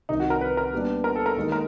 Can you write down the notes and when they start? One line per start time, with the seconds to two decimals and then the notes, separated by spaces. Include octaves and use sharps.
0.09 C2 C3 D#3 D#4
0.20 F#4
0.30 A#4
0.41 B4
0.57 A#4
0.73 A#2 G3 B3 D4
1.04 A#4
1.16 A4
1.26 A#4
1.37 D#2 D#3 G#3
1.52 A#4